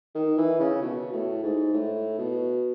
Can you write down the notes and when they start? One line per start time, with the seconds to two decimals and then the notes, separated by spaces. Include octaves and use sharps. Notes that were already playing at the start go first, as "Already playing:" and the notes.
0.15 D#3
0.37 E3
0.60 C#3
0.82 B2
1.12 A2
1.43 G#2
1.74 A2
2.18 B2